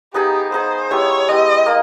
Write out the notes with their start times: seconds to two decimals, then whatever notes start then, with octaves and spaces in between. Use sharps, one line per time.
0.14 B3 D#4 G4 G#4
0.52 B3 D#4 G#4 C5
0.91 G#3 B3 E4 G4 C#5
1.28 G#3 B3 E4 G4 D#5
1.66 A#3